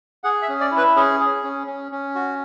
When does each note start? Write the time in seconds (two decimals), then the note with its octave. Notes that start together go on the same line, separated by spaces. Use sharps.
0.24 G#4 F#5
0.42 E5
0.49 C#4
0.61 D5
0.71 E4
0.78 B4
0.96 C#4 G#4
1.20 G#4
1.43 C#4
1.67 C#4
1.92 C#4
2.15 F#4